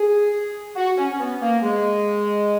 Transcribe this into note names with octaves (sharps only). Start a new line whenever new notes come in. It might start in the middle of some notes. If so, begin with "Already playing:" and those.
Already playing: G#4
F#4
C#4
C#4
B3
A#3
G#3